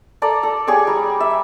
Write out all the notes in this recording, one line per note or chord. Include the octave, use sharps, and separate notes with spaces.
A4 D5 A#5
A4
G4 G#4 C#5 D5
G3 A#5
E5